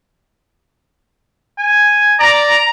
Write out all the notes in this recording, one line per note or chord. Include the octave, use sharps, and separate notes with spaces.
G#5
D5 A#5